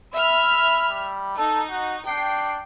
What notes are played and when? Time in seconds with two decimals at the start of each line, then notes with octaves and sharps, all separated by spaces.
0.14 E5 B5 F6
0.89 G3
1.38 D#4 A4
1.71 F#4
2.07 D4 G5 C7